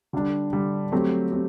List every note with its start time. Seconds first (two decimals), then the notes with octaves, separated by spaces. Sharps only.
0.13 D3 G3 D4
0.53 D3 G3 D4
0.92 F#3 A3 C4 G4
1.32 C4 G4